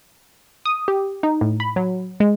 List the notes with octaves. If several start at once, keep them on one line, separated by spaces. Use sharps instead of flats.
D#6
G4
D#4
A2
B5
F#3
G#3